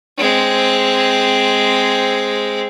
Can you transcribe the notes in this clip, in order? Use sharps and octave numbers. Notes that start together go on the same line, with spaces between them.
G#3 C4